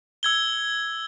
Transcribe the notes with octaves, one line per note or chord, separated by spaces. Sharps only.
E6 G#6 G7